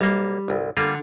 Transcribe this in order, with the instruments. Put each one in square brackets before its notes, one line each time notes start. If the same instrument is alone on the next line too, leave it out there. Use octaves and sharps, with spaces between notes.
[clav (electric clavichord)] B1 A#3 [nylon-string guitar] G3
[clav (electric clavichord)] G1 C2
[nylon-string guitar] D3 [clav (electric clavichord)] G3 A#3 F4